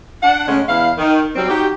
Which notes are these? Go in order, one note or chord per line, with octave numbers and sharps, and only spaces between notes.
D4 F#5
C#3 G#3 A3 C#4
E2 E4 F5
D#3
F#3 G3 C4
D#4 F#4 G4